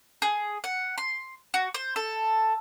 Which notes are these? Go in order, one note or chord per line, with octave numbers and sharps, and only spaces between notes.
G#4
F#5
C6
F#4
C5
A4